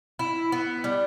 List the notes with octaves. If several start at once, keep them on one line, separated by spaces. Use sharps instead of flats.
E4
B3
G3